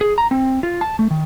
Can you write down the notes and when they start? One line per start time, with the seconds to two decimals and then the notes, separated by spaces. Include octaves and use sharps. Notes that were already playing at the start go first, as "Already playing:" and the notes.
0.01 G#4
0.18 A#5
0.31 C4
0.63 F4
0.81 A5
0.99 A3
1.11 D#3